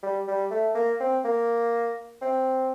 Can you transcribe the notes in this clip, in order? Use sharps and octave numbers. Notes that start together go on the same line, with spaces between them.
G3
G3
A3
A#3
C4
A#3
C4